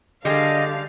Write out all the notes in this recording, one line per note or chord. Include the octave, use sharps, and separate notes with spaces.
D3 G3 G#3 D#5 F5